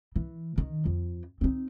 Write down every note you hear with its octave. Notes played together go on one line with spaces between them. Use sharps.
E3
D#3
F2
C4 D#4